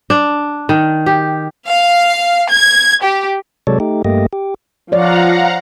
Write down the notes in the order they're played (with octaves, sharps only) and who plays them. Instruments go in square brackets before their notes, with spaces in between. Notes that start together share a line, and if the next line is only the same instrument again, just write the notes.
[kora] D4
D#3
G4
[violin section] F5
G#6
G4
[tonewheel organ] C3 F#3 G#3 A4 C#5 D5
A3 D#4 G4
G2 A3 A#3 G4 D#5
G4
[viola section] F3 [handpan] C#5 D5 [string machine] F5 F#5 A#5